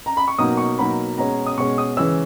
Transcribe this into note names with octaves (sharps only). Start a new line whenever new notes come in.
A#5
B5
C#6
B2 F#3 A#3 D#4 D#6
C#6
B2 F#3 A#3 D#4 B5
B2 G#3 C#4 A#5
D#6
B2 G#3 C#4 C#6
D#6
C#3 E3 G#3 C#4 E6